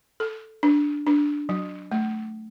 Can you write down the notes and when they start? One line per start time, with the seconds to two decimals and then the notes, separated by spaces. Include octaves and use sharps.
0.20 A4
0.63 D4
1.07 D4
1.49 F#3
1.92 A3